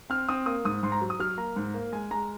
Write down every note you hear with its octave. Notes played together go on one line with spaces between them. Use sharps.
C4 F6
C4 D#6
A#3 D#6
G#2 D#6
G#2 C6
A#5
F#3
D#6
F#3 F6
A#3 A#5
G#2
A#3
G#3 G#5
G#3 A#5